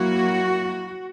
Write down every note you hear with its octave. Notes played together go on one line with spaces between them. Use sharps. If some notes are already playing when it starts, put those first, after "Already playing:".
Already playing: F#3 A#3 E4 F#4